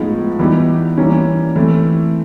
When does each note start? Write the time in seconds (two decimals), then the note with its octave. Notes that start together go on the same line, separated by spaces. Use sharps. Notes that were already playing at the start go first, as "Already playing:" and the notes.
Already playing: A2 F3 G#3 B3 D#4
0.39 E3 G3 B3 D#4 G4
0.98 E3 G3 A#3 C#4
1.56 E3 A3 C4